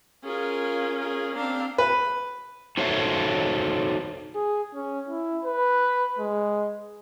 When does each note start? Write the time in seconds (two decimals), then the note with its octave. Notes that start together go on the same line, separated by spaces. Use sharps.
0.24 C#4 F4 G#4 A#4
0.99 G#4 A#4
1.36 C4 D4 F5 A#5
1.78 B4
2.77 D#4 F#4 A4 C5 C#5 E5
4.35 G#4
4.75 C#4
5.08 E4
5.45 B4
6.19 G#3